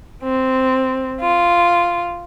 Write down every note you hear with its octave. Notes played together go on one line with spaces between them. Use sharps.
C4
F4